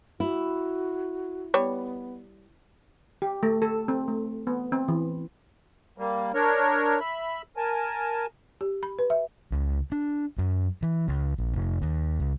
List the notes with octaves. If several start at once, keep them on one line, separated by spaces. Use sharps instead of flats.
E4 F#4
G3 B3 C#5
G4
A3
A4
C4
A3
B3
C4
E3
G3 A#3
D4 A#4 C#5
E5 B5
A#4 G#5 A5
G4
B5
B4
E5
C#2
D4
F#2
E3
C#2
A#1
F1
D#2
C#2